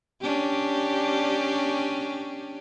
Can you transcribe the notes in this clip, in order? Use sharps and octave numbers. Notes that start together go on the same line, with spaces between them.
C#4 D4 G4